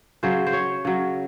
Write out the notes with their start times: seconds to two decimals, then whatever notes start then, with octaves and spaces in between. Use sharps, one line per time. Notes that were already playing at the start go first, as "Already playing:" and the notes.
0.23 C#3 F#3 C5
0.47 C5
0.53 C#5
0.85 C#3 F#3